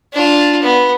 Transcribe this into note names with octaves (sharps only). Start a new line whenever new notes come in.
D4 F4
B3